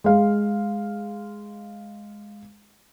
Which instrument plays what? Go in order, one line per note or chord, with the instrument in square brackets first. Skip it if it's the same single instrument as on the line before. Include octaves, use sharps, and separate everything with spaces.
[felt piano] G#3 F5